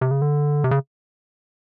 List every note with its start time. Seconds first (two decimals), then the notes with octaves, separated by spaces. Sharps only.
0.01 C3
0.11 C#3
0.22 D3
0.64 C3
0.71 C#3